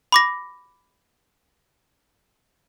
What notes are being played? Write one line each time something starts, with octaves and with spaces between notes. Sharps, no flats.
B5 D6 A#6